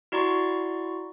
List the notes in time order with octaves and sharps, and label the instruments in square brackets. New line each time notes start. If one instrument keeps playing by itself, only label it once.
[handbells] E4 F#4 D5 A#5 C6 C#6